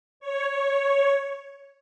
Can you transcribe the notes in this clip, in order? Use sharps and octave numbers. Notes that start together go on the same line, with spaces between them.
C#5
C#5